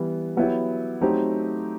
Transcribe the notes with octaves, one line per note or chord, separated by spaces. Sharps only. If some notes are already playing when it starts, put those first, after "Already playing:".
Already playing: E3 G3 B3
F#3 B3 E4 G4
F#3 A3 C4 D#4 G4